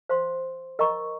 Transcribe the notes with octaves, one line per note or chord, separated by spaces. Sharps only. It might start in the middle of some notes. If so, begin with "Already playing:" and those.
C5 F5 C6
A#4 D#5 A#5 C#6